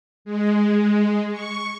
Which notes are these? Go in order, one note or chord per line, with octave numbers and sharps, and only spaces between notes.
G#3
C#6